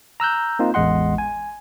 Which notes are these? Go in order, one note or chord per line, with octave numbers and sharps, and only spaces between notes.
A#5 E6 F#6 G6
A#3 C4 D#4 F4
A1 E2 G#3 D#5 F#5 C6
G#5